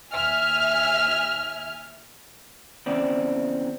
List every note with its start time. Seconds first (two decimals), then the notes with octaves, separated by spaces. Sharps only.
0.14 D#2 E5 G#5 F6
2.86 E2 C#3 C4 D5